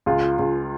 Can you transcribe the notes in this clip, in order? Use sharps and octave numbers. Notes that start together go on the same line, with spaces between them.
C#2 F4
C#2